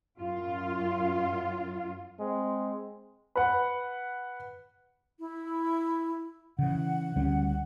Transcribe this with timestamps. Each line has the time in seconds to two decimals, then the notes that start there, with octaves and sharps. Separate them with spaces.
0.20 F#2 F4
2.19 G#3 C4
3.36 B4 F#5
5.20 E4
6.59 C#3 E3 F#5
7.16 D2 G3 C#4